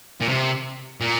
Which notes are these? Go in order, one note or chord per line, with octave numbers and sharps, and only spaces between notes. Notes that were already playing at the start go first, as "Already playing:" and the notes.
A#2
C3
A#2